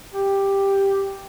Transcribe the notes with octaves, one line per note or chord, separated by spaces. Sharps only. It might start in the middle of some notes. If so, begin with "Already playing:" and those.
G4